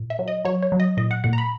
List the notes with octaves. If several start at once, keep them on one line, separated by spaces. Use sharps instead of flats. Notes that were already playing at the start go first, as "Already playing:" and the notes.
Already playing: A#2
E5
F#3
D#5
F#3 C#5
C#5
F#3
D#5
A#2 D#5
F#5
A#2 F#5
A#5
B5